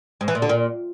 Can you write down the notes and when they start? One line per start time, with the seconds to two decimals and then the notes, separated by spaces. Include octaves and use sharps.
0.21 G#2
0.28 E3
0.35 A#2
0.42 D3
0.49 A#2